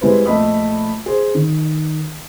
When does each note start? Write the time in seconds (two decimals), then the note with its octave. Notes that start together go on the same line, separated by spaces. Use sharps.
0.01 G3 G#3 E4 B4 C5
0.26 A#1 A3 D#5 B5 D#6
1.06 G#4 C5
1.35 D#3